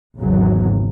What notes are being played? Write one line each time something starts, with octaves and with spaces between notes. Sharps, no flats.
G#1 E2 C#3 F#3